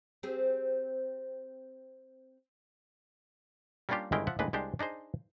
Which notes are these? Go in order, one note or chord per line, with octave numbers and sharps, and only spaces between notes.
C4 G4 G#4
G3 A#3 C#4 D4 F4 G4
G1 D#3 G#3 E4 A#4 G5
F3 E5 F#5
A1 D#2 G#3 D4 B4
C2 G#3 D4 G4 C5
D4 D#4 G#4 C5